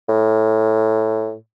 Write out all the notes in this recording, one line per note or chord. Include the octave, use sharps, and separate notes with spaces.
A2